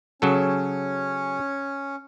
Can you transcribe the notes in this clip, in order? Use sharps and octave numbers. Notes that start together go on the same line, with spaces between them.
C#3 F#3 C#4 A4